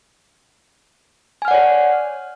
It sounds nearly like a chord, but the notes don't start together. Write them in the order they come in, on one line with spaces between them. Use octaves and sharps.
G#5 F6 F#5 D5 C#5